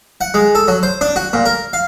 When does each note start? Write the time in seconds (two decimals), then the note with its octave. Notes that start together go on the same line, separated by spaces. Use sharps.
0.21 F#5
0.34 G#3
0.55 A4
0.68 F#3
0.83 C5
1.01 D4
1.16 F#4
1.33 A#2
1.46 A#4
1.73 F5